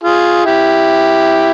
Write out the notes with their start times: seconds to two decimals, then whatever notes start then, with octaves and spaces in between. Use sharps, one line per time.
0.04 F4 G#4
0.45 E4 G4